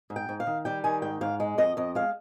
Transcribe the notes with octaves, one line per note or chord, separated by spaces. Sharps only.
G#2
G5
G#2
F5
D#3
G3 G5
D#3 G#5
G#2 G5
G#2 F5
G#3
F2 D#5
F2 D#5
G#3 F5